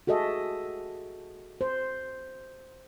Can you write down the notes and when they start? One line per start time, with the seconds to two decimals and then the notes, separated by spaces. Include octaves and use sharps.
0.07 F#4 G#4 A4 D#5 E5
1.61 C5